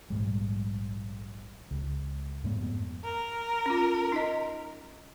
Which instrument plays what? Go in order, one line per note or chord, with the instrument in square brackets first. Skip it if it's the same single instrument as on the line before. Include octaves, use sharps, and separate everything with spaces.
[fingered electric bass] A#1 G#2 G3
C#2
F2 G#2 A3 B3
[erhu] A#4
[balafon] C#4 F4
D#4 D#5